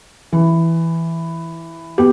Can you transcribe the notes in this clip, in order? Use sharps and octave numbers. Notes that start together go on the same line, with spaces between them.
E3
B3 G4